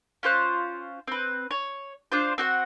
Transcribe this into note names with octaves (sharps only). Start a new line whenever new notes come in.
C#4 F4 C5 F#6
C4 B4
C#5
D4 F4 C5
C4 F#4 F#5